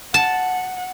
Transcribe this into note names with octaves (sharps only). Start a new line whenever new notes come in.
F#5 A5